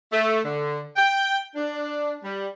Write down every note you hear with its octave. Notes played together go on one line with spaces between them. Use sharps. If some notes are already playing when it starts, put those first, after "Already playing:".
A3
D3
G5
D4
G3